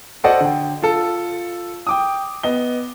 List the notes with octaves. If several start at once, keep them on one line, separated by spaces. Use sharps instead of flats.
F#4 A4 C5 D5 D#5 F#5
D3 G5
F4 A4
G5 D6 D#6
B3 D#5 G7